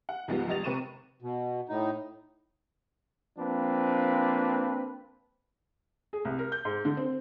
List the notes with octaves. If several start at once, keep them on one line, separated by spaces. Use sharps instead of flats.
F#5
C#2 G#2 F3 G3 B3
F1 G3 D#5 A6 F7
C3 C4 B4 C#6 D#7 E7
B2
A2 D#4
F3 A#3 C4 D4 B4
G#4
C2
A#4
G6
G#2
D3
C4